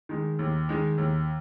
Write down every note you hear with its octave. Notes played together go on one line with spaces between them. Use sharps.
D#3 G#3
D#2
D#3 G#3
D#2